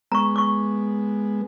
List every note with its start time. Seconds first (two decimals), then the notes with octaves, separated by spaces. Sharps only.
0.12 G#3 B3 A#5 C#6
0.36 C#6 D6